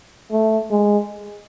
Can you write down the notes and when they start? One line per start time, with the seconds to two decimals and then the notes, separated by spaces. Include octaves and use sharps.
0.32 A3
0.71 G#3